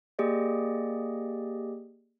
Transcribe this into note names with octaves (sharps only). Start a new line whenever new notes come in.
A#3 G4 G#4 D5 D#5